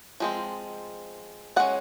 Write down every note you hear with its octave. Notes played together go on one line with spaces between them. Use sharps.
F3 G#3 C4
G#3 C#4 F#5